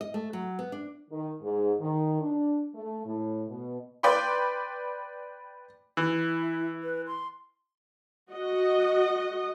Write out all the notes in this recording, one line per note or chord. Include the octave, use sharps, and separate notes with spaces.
D#5
A3
F#3
B3
D4
D#3
G#2
D#3
D4
A3
A2
B2
B4 D5 G5 B5 C6
E3 E4
B4
C6
F#4 D#5